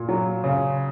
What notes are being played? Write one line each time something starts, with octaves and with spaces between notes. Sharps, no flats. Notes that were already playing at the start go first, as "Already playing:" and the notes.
Already playing: A#2
F#3
C#3